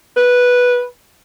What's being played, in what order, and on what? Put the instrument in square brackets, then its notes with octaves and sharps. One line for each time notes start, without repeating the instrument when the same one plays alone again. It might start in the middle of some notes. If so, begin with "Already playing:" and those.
[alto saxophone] B4